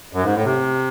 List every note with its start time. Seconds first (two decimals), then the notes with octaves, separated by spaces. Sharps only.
0.13 F#2
0.24 G#2
0.34 A2
0.45 C3